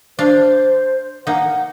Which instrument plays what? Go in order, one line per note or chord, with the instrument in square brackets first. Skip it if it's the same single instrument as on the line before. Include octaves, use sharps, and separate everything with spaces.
[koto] D4 F5 [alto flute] C5
[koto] A#3 D#4 [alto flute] F#5